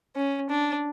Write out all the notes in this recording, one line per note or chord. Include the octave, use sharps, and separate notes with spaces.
C#4
D4